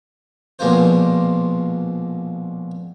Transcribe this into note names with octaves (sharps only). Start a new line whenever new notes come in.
A#1 B2 G#3 A#3 F4 C5